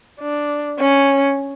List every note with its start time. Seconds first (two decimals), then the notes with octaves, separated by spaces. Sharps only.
0.20 D4
0.80 C#4